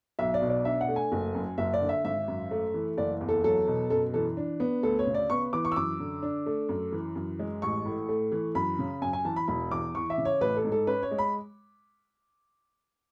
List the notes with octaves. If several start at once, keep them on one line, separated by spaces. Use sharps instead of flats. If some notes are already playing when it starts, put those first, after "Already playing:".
B1 E5
D5
B2
D5
D4 E5
F#5
A3
G#5
F#1
F#2
F#1 E5
D5
D3
E5
G#1 E5
F#2
A3
E3
F#1 D5
E2
A4
F#3 A4
B2
F#2 A4
E3 A4
D4
B3
D2 A4
C#5
C#3
D5
B3 C#6
E3 D6
C#6
E6
F#2 D6
D3
D4
A3
F#2
E3
F#2
G#3
A1 C#6
A2
A3
E3
F#2 B5
C#3
F#2 G#5
G#5
E3 A5
B5
E1 B5
E2 D6
E3 C#6
E5
C#3
C#5
A1 B4
A4
G#2
A4
C#4 B4
C#5
G#3
B5